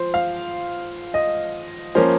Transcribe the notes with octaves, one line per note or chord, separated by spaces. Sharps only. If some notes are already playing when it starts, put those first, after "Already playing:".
Already playing: F3 C5
F5
D#5
F3 A#3 C#4 C5